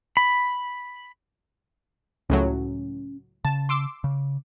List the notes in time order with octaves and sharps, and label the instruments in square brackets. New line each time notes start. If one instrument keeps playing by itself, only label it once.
[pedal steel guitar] B5
[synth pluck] C#2 A2 F#3 [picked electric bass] C#4
[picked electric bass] C#3 [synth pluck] A5
[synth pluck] C6 D6 E6
[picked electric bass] C#3